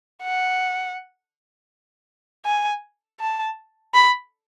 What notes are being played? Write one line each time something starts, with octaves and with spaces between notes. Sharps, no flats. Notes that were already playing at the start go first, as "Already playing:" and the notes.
F#5
G#5
A5
B5